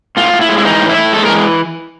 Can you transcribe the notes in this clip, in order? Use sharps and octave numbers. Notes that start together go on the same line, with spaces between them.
A2 F4
A2
E4
G#3
E4
E3 D#4
A2
E4
A2
G#3 A4
A#4
E3